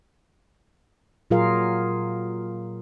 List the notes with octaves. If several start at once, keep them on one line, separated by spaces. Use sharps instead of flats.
A#2 F#3 F4 G#4 A#4 F5